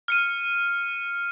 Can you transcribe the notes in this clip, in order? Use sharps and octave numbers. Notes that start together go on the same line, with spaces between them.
F6 C#7 D#7